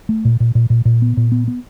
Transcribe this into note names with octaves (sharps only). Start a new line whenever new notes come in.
A3
A#2
A#2
A#2
A#2
A#2
B3
A#2
B3
B3